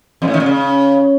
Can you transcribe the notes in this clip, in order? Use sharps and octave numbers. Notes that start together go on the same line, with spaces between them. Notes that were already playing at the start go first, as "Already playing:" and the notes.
F2
A2
D#3
A#2
C#3